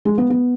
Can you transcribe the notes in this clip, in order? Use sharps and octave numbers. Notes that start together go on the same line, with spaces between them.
G#3
B3
B3